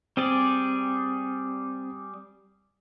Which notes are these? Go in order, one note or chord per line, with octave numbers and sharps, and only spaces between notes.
G3 C4 G#4 D5